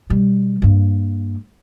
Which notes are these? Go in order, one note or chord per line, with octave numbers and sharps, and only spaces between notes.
B2 G3
G2 A#3